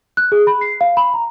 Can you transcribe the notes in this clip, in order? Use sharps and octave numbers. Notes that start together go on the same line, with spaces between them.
F#6
G#4
B5
C7
F5
B5
A#5